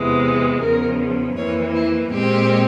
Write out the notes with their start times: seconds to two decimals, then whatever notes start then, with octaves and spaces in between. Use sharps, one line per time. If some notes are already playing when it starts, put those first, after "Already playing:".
Already playing: E2 C3 E3 G#3
0.61 E2 C#3 F3 A#4
1.36 F2 E3 A#3 C#5
1.74 E4
2.12 A#2 G#3 C4 G4